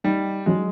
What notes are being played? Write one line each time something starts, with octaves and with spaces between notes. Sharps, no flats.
G3 D#4
F#3 G#3